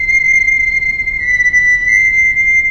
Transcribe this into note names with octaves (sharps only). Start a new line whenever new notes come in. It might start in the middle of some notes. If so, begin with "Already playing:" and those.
Already playing: C7
B6
B6
C7
C7
C7